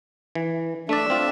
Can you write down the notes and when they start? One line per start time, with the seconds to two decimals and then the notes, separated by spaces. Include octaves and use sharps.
0.35 E3
0.89 A3 D4 D5 E5
1.10 C4 F4